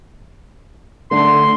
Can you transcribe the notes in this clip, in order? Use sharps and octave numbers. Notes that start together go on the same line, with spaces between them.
D3 A3 C6